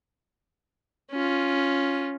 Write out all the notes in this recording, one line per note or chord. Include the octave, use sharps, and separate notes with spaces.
C#4 F4